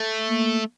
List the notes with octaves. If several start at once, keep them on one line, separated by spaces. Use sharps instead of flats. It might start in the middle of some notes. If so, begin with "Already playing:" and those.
Already playing: A3
A#3